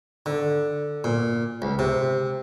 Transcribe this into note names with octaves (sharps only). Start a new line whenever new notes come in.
D3
A#2
C#2
C3